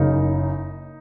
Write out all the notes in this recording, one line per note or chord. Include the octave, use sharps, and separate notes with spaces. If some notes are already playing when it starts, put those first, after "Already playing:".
Already playing: F#1 F#2 C#3 D#4